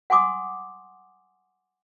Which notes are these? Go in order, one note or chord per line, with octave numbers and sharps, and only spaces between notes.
F#5 G#5 C6 D6 D#6